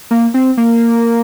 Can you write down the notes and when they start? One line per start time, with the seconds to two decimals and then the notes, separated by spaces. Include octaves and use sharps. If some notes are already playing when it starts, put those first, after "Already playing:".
0.11 A#3
0.34 C4
0.57 A#3